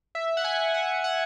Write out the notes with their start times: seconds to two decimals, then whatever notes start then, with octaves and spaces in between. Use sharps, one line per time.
0.15 E5
0.37 F#5
0.44 G#5
0.74 F#5
1.04 F#5